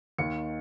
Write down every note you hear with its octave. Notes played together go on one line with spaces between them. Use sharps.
D#2 D#3 C#7